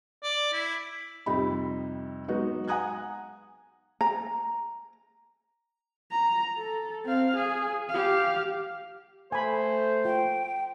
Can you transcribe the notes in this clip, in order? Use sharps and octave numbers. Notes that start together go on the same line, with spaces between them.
D5
E4
F2 C3 G3 D#4 B5
F#3 G#3 B3 D#4 F#4
F#5 G#5 A#5 D#6 F#6 G#6
A#5
A#5
A4
C4 F5
G#4
G4 F5
A3 C5 G#5 B5
F4 G5